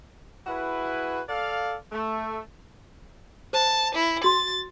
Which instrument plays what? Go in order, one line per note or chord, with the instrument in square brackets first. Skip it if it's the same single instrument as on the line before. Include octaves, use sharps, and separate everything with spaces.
[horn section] E4 F#4 G#4 B4
A4 D5 F5
A3
[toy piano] C5 [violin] A5
[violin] E4
[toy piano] F#4 C6 [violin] A6